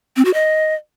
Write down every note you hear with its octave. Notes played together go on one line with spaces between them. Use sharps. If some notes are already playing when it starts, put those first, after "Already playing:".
C4
F#4
D#5